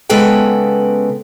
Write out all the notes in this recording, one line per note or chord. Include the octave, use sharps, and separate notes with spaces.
C#3 G#3 B3 A4 B4 G5